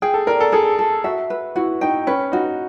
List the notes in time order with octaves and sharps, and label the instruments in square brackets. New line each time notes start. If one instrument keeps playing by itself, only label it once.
[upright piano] G#4 [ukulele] G5
[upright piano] A4
[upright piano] A#4 [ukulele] D5
[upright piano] A4
[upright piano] G#4 [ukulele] A4
[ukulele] A4
[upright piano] F#4 [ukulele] E5
[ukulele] B4
[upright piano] E4 [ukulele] F#4
[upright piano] D#4 [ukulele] G5
[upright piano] C#4 [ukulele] B4
[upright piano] D#4 [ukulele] F#4